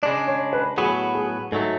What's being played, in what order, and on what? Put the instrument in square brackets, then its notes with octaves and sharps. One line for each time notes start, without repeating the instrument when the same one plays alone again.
[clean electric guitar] C#3 G#3 D4 [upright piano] D5
[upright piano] C#5
B4
[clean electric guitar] A2 F#3 B3 F#4 [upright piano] G#4
[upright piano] G#4
[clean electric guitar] G#2 F#3 A3 [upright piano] A4